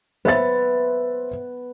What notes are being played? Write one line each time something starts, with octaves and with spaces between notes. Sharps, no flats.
B3 C5 E5 A6